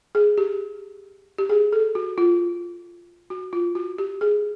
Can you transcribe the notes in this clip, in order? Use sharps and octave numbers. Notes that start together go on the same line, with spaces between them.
G#4
G4
G4
G#4
A4
F#4
F4
F#4
F4
F#4
G4
G#4